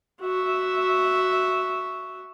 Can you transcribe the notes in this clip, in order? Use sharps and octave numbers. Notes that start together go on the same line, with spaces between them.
F#4 E5